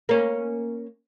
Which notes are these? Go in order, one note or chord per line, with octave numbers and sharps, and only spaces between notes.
A#3 C#4